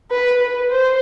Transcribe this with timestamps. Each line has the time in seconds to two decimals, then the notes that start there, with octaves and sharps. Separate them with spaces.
0.11 B4
0.41 B4
0.71 C5